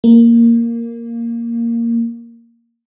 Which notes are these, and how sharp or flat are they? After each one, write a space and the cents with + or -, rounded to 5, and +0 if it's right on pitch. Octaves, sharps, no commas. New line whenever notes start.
A#3 -5